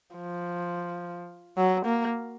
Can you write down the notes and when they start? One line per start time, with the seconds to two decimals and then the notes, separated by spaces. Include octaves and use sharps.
0.16 F3
1.57 F#3
1.86 A#3